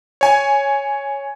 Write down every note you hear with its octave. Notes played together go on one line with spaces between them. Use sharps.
C#5 G#5